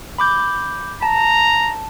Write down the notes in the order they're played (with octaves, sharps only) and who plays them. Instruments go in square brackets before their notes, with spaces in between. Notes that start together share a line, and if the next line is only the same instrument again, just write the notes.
[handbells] B5 D6 G6
[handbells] A5 [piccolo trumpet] A#5